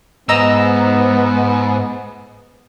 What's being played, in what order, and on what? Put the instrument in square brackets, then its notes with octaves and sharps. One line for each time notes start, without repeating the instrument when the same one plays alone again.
[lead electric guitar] G#2 [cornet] B3 [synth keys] D#5 A#5 E6